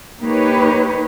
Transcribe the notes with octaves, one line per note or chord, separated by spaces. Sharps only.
A#3 D#4 G4 B4 C#5